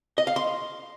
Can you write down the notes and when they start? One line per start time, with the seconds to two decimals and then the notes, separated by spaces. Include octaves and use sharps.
0.18 D#5
0.27 F5
0.36 C6